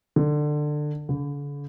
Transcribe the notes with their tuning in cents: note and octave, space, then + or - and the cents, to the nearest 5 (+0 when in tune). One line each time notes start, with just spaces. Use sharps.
D3 +20
D3 -45